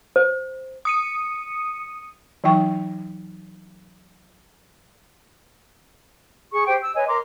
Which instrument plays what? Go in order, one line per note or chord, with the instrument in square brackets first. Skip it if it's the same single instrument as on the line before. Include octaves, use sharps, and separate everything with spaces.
[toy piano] C5
[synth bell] D#6 C#7 D#7
[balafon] E3 F#3 D#4 G5 C#6
[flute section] G#4 C#6
G4 C5 G5
E6
B4 C#5 D#5 G#5
A#4 A#5 C6 D6